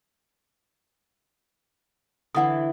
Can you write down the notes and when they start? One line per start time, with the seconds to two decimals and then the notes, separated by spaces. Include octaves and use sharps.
2.35 D3 E3 E4 F#5 D#6